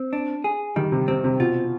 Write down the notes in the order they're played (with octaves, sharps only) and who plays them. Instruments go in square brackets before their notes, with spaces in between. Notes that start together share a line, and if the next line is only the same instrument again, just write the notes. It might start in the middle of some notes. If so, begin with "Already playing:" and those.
Already playing: [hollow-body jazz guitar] C4
D4
G#4
[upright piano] D#3 [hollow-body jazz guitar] G3
[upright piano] C3
[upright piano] C3 [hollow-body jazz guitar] C4
[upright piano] C3
[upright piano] B2 [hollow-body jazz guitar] F4